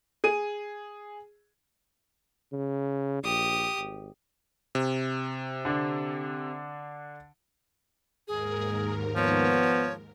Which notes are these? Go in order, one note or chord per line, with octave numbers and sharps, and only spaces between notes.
G#4 D#7
C#3
A#1 G4 D#6
G#1
C3
D3 D4
D#2 G#2 G#4 A#4
F3 B3 C#5